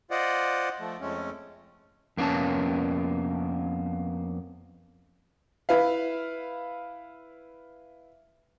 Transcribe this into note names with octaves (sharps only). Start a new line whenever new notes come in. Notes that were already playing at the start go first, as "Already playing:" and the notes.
F4 C5 D5 D#5 F#5
F3 A3
F2 G#3 A3 C#4
F2 A#3 B3 C#4 A5
E4 B4 F5